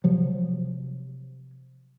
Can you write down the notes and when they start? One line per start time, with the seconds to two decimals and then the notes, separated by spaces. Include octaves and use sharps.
0.04 C3 F3 F#3